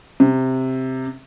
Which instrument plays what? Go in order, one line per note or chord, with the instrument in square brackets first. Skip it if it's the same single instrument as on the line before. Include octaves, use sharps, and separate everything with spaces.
[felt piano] C3